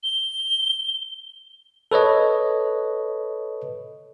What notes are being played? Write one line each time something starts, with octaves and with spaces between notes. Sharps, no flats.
G7
A4 B4 C#5 D#5